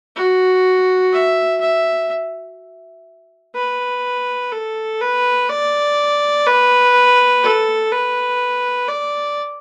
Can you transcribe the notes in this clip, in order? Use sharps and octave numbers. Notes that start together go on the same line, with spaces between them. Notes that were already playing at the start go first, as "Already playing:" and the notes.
F#4
E5
E5
B4
A4
B4
D5
B4
A4
B4
D5